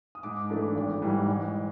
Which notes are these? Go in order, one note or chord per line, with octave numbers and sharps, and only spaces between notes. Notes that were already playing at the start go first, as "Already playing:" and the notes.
D#6
G#2 D6
E3 A3 D4
G#1
G#2 E3 G3
G#2
G#3